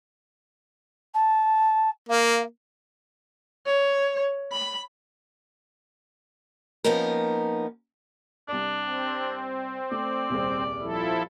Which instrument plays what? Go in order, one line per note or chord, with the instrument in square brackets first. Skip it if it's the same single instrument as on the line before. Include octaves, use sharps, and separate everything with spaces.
[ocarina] A5
[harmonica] A#3 [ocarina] F5
[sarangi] C#5
B5
[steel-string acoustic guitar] F3 A#3 B3 C#4 D#4 A#4
[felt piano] C2 D5 [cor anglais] D4
[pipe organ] C4
[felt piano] A3 [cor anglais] D5
[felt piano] D#1 C2 G#4
[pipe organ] F3 E4 A4